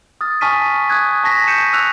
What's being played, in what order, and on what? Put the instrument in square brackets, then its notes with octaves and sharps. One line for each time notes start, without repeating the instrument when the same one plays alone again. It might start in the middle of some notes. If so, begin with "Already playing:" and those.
[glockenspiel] D#6 F6 A6
G#5 A5 C#6 F6 B6 D#7
D#6 F#6 G#6
A5 C#6 A#6 B6
G6 C#7 D#7 E7
E6 F#6 F7